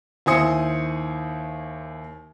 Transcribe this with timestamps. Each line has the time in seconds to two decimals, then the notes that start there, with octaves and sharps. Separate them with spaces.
0.26 D#2 E4 C5 G#5 D#6 C#7